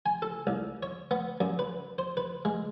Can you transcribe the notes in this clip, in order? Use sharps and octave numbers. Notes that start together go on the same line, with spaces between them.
G#5
A4
C2
C#5
B3
F#2
B4
C5
B4
G#3